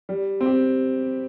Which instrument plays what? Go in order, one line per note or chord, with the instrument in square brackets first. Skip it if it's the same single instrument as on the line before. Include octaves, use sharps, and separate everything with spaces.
[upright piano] G3
C4
G4